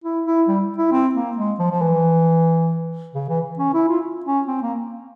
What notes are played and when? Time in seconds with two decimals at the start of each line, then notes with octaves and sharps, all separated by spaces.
0.04 E4
0.26 E4
0.48 G3
0.78 E4
0.92 C4
1.15 A#3
1.37 G#3
1.59 F3
1.71 F3
1.82 E3
3.15 C#3
3.29 E3
3.59 C#4
3.74 E4
3.89 F4
4.25 C#4
4.48 C4
4.62 A#3